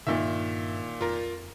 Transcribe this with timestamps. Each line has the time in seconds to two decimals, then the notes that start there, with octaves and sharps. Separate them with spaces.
0.07 G2 A#2 D#3 E5
1.01 F2 F4 A#4